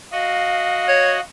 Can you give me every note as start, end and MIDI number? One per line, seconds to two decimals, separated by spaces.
0.12 1.20 66
0.12 1.20 75
0.12 1.21 77
0.88 1.14 73